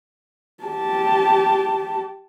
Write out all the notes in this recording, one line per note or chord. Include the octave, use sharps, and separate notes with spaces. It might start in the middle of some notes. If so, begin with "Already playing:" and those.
G4 A5